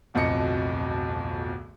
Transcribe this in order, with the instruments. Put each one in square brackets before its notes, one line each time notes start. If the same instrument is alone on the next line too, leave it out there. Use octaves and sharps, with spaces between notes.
[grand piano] D1 B1 F2 B2 D#5 C#7